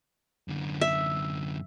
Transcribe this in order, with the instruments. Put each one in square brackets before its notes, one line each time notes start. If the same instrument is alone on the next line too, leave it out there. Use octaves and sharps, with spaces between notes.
[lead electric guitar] F#2 D3
[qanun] E5